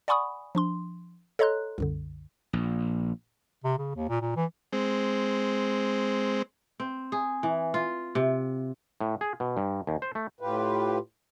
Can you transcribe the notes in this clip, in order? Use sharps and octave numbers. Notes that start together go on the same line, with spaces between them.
D5 F#5 G#5 B5 C#6 D#6
F3 D4 C6
A4 C#5 D#5 A#5 C6 F#6
C2 F#2 D3
A#1
C3
C#3
D#2
A#2
A#2
E3
G#3 C4
C4
G#4
E3
F4
C3
A2
G#4
B2
G2
D#2
C5
A3
A2 F4 G4 B4